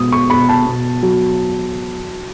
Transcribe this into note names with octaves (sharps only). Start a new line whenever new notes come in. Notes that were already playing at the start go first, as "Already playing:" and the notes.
Already playing: B2 G#3 D#6
C#6
B2 B5
A5
B2
F#3